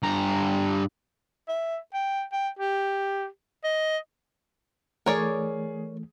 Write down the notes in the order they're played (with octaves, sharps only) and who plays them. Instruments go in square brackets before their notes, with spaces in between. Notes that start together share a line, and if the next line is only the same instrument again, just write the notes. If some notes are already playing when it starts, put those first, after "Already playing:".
[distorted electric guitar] G2 A#5
[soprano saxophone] E5
G5
G5
G4
D#5
[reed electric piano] E3 A3 [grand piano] G#4 G#5 [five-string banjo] A#4 C#5 D5